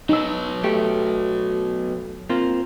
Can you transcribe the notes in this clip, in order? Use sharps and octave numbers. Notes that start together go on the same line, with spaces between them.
B2 F#3 D#4 E6
A3 G4
A#3 C4 F4